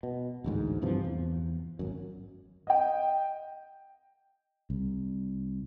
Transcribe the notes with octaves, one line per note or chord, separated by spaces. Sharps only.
B2
A1 D2 G#2
G2 C3 E3 F3
E2
G#1 F#2
D#5 G5
C2